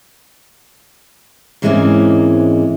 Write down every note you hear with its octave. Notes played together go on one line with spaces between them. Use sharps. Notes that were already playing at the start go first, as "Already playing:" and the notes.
G#2 E3 G#3 A#3 C4 C#4